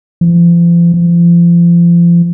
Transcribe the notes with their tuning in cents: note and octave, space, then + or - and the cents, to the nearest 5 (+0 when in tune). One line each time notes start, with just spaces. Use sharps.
F3 -40
F3 -30